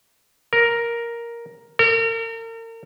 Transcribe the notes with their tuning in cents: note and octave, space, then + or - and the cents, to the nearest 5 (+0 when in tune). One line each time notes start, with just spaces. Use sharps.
A#4 +5
A#4 -40